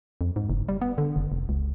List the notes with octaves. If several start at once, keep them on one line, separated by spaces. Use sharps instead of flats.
F2
G#2
F#1
G3
B3
D3
F#1
F1
C#2